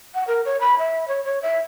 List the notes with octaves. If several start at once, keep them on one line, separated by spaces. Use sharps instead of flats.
F#5
A#4
C#5
B5
E5
C#5
C#5
E5